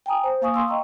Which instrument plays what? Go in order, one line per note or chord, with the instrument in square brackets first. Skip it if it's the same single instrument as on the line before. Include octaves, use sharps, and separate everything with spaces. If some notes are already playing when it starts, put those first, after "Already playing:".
[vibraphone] G5 G#5 A#5 D#6
C5
A#3 F5 G#5 C#6 D#6
F5 C6 E6
D#5 G5 A#5 C#6